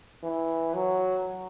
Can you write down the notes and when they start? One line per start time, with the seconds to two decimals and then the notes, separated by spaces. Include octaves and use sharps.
0.23 E3
0.74 F#3